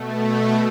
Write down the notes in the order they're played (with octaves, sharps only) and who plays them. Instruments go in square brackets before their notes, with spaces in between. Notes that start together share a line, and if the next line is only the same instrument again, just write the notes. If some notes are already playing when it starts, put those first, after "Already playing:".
Already playing: [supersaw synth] B2 A3